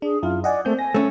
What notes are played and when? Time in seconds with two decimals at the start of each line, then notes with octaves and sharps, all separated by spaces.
0.02 D4 G#4
0.23 F#2 E4 F4
0.44 D5 D#5 F#5 G#5
0.65 A3 A#3 C4 G6
0.79 G#5 A#6
0.94 A3 C#4